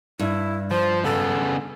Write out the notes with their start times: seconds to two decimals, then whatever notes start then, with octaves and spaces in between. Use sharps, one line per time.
0.19 G2 E4
0.71 F3 C5
1.04 C#3 B3 A4